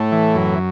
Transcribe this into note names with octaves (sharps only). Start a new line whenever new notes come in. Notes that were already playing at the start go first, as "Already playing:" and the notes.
Already playing: A2 A3
E3
F#2